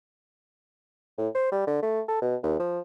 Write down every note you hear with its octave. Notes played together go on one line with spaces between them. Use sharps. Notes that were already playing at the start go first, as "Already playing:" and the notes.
A2
C5
G3
D3
A3
A4
B2
D#2
F3